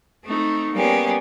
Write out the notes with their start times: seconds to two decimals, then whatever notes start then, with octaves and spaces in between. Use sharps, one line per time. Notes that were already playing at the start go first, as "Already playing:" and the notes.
0.24 A3 C4 D#4
0.73 G3 A#3 B3 C#4 G4 G#4